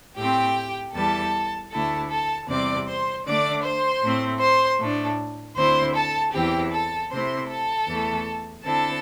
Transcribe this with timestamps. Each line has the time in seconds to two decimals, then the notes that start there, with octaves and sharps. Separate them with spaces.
0.17 A2 A3 C4 G4 G5
0.94 E2 E3 G3 A4 A5
1.71 D2 D3 A3 E4 A4 A5
2.10 A4 A5
2.48 E2 C3 G3 C4 D5 D6
2.87 C5 C6
3.25 D3 A3 D4 D5 D6
3.64 C5 C6
4.03 A2 A3 C4
4.41 C5 C6
4.80 A2 A3 D4
5.57 D2 D3 C4 E4 C5 C6
5.95 A4 A5
6.34 E2 E3 C4 E4 G4 G5
6.72 A4 A5
7.11 C3 A3 C4 E4 C5 C6
7.49 A4 A5
7.88 E2 E3 A3
8.65 D3 C4 E4 A4 A5